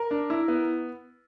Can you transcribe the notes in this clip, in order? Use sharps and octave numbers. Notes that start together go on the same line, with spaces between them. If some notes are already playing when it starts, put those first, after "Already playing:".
Already playing: A#4
D4
E4
B3